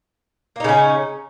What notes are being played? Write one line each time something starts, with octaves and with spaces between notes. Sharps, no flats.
C#3 A#3 C#4 D#4